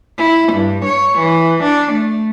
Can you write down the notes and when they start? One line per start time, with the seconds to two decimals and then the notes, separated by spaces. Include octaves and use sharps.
0.18 E4
0.53 G2
0.85 C#5
1.19 E3
1.63 D4
1.92 A3